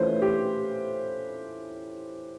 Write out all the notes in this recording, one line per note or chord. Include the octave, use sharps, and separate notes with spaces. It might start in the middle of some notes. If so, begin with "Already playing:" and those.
Already playing: E3 A3 C#4 F4 B4 C5
G4